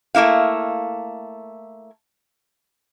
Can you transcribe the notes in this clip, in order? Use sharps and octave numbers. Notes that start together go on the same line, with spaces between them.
A3 A#3 E4 F5